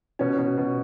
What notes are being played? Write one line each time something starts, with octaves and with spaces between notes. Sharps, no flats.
B2 C#4
B2
B2